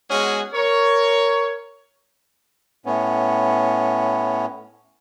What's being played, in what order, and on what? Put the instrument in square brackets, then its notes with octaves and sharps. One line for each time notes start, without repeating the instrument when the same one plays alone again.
[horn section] G#3 B3 C#4 F#4 G#4
A#4 C#5
[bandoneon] A2 B3 C#4